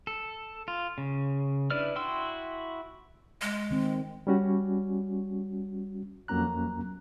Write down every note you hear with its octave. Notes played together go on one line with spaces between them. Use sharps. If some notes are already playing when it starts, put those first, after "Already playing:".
A4
F4
C#3
D4 E4 B4 D5 F6
E4 F#4 G5 C6 E6
G#3
D#3 C4
G3 C#4 F#4
F2 F#3 A#3 C#4 A#5 F#6